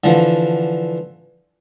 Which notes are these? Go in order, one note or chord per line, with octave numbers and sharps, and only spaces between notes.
D3 E3 F3